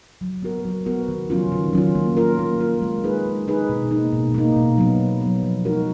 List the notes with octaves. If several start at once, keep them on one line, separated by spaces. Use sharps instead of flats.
F#3
B3 F#4 A#4
F#3
B3 F#4 A#4
D#3
F#3 C#4 F4
D#3
F#3 C#4 F4
A#3
F4 A#4
A#3
F4 A#4
G#3
D#4 G#4 B4
G#3
D#4 G#4 B4
B2
A#3 D#4
B2
A#3 D#4
B2
F#3 B3
B2
F#3 B3
F3
G#3 D#4 F#4 A#4